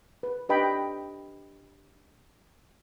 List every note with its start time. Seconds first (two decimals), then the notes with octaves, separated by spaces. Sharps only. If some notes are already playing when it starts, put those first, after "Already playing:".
0.23 B4
0.49 D4 G4 B4 D#5 G5 B5